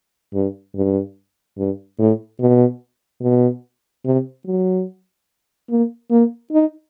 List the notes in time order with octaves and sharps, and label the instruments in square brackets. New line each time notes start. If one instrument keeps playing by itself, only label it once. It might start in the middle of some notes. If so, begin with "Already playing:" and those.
[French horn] G2
G2
G2
A2
B2
B2
C3
F#3
A#3
A#3
D#4